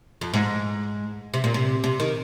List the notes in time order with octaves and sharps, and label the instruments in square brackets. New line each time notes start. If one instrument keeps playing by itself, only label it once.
[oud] F2
G#2
C3
A#2
C3
C3
D#3